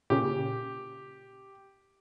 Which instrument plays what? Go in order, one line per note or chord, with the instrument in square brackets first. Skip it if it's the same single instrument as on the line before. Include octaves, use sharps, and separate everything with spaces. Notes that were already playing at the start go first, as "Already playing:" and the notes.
[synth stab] A#2 C#3 [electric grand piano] G4